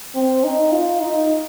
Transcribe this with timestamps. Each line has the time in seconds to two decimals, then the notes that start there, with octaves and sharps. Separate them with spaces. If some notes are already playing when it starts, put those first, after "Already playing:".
0.15 C4
0.44 D#4
0.72 F4
1.01 D#4